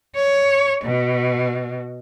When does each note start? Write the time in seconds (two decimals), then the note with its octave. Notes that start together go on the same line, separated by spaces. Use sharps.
0.16 C#5
0.84 B2